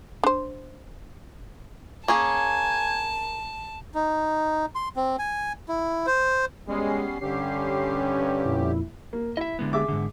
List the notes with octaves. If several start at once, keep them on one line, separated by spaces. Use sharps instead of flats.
D4 C5
A#3 C#4 G#4 G#5 A5
D#4
C6
C4
G#5
E4
C5
G3 G#3 B3 C#4 C7
G2 D3 C#4 G4
F2 A#2 E4
A#3
E4 D#5 E5
D3 G#3 B3
G#4 E5 D6
G#2 D3